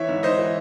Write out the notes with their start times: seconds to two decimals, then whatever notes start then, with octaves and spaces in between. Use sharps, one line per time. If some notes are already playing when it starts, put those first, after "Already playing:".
Already playing: E3 C#5 E5
0.09 G#2
0.23 G#2 C5 D#5
0.39 E3